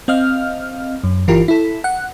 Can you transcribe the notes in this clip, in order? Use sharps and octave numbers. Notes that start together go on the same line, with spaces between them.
C4 D#5 F5 F6
F#2
G1 E3 F4 G4 A#4
E4 A4
F#5